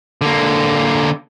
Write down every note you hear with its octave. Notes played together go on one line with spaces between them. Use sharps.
D3 A#3